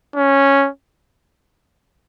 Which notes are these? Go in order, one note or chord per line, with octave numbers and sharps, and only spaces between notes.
C#4